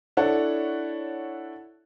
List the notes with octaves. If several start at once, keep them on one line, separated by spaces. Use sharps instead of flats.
D4 E4 A4 C#5 F#5